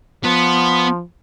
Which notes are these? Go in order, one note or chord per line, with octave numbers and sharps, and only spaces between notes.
F3 B3